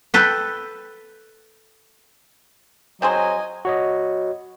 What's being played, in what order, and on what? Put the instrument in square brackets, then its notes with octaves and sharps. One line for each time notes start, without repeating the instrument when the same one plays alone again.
[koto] A4 B4 G5
[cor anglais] F#3 [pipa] C4 G#4 C5 [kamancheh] D#5 G#5
[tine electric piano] F#4 C#5 D#5